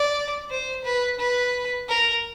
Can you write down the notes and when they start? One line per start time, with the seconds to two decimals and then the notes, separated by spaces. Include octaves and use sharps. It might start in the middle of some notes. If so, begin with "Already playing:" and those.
Already playing: D5
0.51 C5
0.85 B4
1.19 B4
1.89 A#4